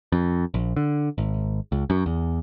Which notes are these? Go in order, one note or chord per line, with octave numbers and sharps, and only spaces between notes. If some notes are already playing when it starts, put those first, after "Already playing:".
F2
A#1
D3
G#1
C#2
F#2
E2